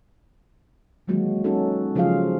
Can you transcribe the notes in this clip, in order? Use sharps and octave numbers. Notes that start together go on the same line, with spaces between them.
D#3 E3 F#3 G#3 A#3 F#4
C#4 D#4 F#4 A4
C#3 F3 F#3 F4 G#4 F5